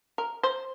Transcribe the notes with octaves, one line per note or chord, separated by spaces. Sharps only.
A#4
C5